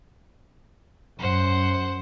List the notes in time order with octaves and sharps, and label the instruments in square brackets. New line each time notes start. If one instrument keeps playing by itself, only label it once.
[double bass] F#2 [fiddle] C5 F#5